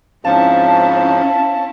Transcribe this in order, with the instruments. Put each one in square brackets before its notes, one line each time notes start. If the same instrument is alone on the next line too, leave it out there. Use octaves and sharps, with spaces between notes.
[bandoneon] G#2 F3 [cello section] C4 C#4 E4 [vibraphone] F5 [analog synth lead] A5